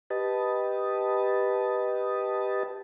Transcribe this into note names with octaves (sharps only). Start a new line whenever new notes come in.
G4 B4 D#5 A5